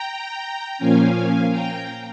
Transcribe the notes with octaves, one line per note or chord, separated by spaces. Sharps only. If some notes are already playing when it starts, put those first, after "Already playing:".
Already playing: G5 A#5
A#2 F3 A#3 C#4 F5 G#5
G5 A#5